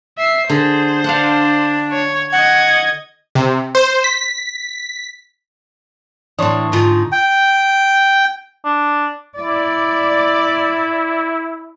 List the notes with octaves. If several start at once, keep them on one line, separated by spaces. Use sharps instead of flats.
E5 C7
D3 G#4 C5
D4 F5 F#5
C#5
D#5 F#5 G#6
C3
C5
B6
A2 E3 D4 C#5 A5 C6 C#6 D#6
G#2 D3 D#4 F4
G5
D4
E4 D5